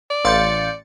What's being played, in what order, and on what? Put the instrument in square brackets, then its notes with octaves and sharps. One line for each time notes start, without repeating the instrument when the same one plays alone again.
[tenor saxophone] D5
[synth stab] A1 A6 C#7 [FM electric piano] F5 C6 G6